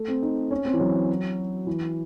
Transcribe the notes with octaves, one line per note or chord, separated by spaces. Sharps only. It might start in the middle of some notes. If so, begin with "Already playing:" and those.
Already playing: A3
C4
D#4
C#4
C4
E3
F#3
E3